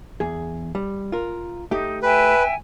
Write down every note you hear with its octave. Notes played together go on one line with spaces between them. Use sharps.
E2 G#4
G3
F4 A#4
A3 D#4 G4
B4 E5 G5 G#5